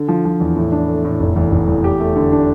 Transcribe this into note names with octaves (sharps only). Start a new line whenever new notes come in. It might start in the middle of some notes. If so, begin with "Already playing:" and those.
Already playing: D3
F3
F3
E2
A2
D4
A3
A2
F1
E2
F1
E2
G4
A3
D3
D4